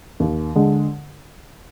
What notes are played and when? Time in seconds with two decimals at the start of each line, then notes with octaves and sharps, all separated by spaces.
0.20 D#2
0.55 D3 G#3